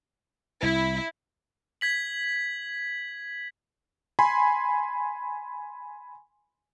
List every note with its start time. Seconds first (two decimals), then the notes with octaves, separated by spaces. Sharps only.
0.63 C2 E4
1.81 G#6 B6 F#7
4.19 G#5 B5 C6